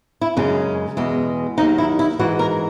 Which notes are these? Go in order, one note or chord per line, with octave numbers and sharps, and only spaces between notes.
E4
F#2 C#3 G#3 C#4
E2 B2 G#3
D#2 D#3 F#3 D#4
E4
E4
G#2 E3 G#3 F#4
A#4